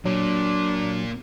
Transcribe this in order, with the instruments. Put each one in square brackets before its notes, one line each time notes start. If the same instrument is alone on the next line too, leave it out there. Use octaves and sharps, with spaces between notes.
[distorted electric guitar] A#2 [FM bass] F#3 [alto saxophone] D4